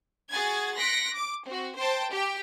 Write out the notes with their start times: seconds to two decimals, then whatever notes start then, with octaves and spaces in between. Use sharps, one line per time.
0.30 F#4 G#4 F#5 G#5 G#6 A6
0.77 C6 F#6 A#6 B6 C#7 D7
1.13 D6
1.46 C4 F#4
1.76 C5 G5 A5
2.11 G4 G5